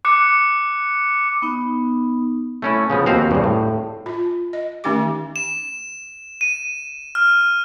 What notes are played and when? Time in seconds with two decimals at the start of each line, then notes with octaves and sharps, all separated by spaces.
0.05 D6 F#6 C#7
1.42 B3 D#4
2.62 A3 C#4 E4
2.90 C#3 F3 B3
3.06 D#2 C4 F#4 F5
3.31 G2 C#3
3.44 A2
4.06 F4
4.53 D#5
4.84 D#3 A3 C#4 D#4 G4 D6
5.36 E7
6.41 D#7
7.15 F6